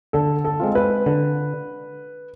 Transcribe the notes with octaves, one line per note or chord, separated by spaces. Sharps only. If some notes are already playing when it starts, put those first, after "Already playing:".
D3 A4
A4
G#3 C4 F4
B4
D3